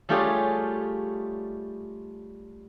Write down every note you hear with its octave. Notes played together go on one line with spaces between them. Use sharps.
G3 A3 F4 G4 G#4 C#5